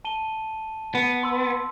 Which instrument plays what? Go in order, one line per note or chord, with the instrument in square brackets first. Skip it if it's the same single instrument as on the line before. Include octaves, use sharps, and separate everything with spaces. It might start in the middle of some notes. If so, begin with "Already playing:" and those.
[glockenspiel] A5 D#7 G7
[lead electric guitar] B3
[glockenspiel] C6 E6